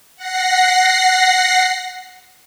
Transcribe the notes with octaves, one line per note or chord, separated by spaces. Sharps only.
F#5 A#6 C7